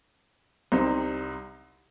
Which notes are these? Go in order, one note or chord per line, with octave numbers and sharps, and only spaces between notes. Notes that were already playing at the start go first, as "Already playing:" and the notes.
C2 C3 G3 C4 D#4